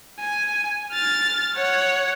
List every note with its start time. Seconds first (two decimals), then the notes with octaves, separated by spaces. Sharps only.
0.20 G#5
0.92 F6 A6
1.55 C#5 F#5